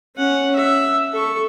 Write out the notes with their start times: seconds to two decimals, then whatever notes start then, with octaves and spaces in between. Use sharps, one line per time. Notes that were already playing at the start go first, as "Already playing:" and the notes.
0.16 C#4 F#5
0.56 E5
1.13 A4 C#6